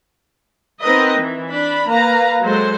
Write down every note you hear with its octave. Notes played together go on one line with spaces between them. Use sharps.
B3 C4 D#4 A#4 B4 D#5
E3
D4 B5
A#3 B4 F5 A#5
F#3 G#3 A4 C5